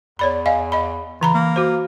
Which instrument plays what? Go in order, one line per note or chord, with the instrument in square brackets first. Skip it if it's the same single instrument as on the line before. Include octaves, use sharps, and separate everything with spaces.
[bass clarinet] E2 [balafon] C#5 D5 B5
[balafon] D#5 F5 G#5
D#5 B5
[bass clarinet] C#3 [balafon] E3 A#5 B5
[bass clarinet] A#3
[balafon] F#4 C5